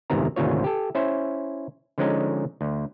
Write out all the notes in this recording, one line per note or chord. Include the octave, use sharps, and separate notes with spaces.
G1 E2 G#2 C3 D#3 A#5
G#1 D2 G#2 C3 F4 C#5
G4 A4
C#4 E4 C5
D3 F3 G#3 C#4 D#4
D2